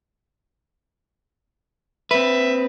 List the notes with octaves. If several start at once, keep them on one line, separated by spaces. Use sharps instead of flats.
C4 B4 E5